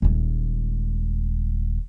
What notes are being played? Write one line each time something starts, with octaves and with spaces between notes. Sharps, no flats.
D#1 G#3